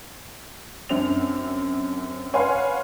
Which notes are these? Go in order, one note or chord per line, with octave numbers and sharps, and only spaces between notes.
F#2 C4 D4 F7
B4 C#5 F5 F#5 G#5 C6